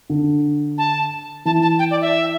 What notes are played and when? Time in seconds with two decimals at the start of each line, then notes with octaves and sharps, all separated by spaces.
0.10 D3
0.78 A5
1.45 E3 A5
1.62 A5
1.79 G5
1.91 D5
2.02 E5